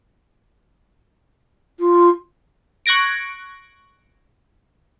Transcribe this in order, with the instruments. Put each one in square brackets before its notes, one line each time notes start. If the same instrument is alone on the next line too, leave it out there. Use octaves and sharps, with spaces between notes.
[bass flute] F4
[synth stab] C#6 F#6 G#6 A#6 D7